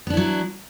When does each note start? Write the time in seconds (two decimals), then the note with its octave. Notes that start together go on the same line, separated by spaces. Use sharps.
0.07 B3
0.10 D4
0.14 E4
0.17 F#3